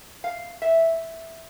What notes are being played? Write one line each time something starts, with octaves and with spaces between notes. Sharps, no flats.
F5
E5